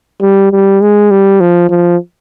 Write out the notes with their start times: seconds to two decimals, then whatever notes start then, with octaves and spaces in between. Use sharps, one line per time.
0.22 G3
0.52 G3
0.81 G#3
1.11 G3
1.41 F3
1.70 F3